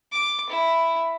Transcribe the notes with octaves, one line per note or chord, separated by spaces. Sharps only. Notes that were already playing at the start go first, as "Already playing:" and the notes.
D6
E4